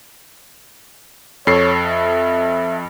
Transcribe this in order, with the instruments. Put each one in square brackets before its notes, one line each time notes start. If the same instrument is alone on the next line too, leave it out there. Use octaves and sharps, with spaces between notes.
[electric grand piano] F2 A4 C7 [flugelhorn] C#5
[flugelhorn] E5